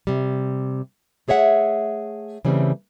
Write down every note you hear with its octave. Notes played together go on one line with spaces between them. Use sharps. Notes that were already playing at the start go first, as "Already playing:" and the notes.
C3 G3
A3 G#4 C#5 E5 F#5
C#3 E3 G3 A3 C4